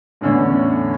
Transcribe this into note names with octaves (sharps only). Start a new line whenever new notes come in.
E2 A2 D3 C#4